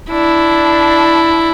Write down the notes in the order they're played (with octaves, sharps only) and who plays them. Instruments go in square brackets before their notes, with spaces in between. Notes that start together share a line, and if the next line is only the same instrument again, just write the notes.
[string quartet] D4 [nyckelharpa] E4